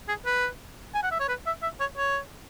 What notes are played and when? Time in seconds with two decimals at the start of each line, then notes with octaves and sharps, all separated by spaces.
0.08 G#4
0.26 B4
0.94 G#5
1.03 F#5
1.11 E5
1.20 C#5
1.29 B4
1.47 E5
1.63 E5
1.80 C#5
1.98 C#5